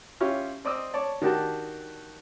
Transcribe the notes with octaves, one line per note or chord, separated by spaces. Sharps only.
C#4 E4 F4 G4 C#5
C4 D5 D#5 E6
C#5 D5 A5
D#3 D4 F#4 G4 A5